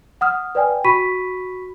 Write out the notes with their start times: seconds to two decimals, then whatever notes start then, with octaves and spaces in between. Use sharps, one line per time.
0.21 F#5 D#6 F6
0.55 B4 D5 G5 G#5
0.84 F#4 B5 C#6 B6 D#7